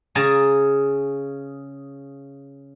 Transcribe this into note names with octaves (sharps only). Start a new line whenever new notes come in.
C#3 G#4 A5 A#5